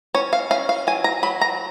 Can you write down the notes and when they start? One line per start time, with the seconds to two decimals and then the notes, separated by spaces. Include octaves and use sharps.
0.14 C#4 C#5
0.33 F5
0.51 C#4 F5
0.69 F5
0.87 F#3 G#5
1.04 A#5
1.23 F#3 B5
1.41 A#5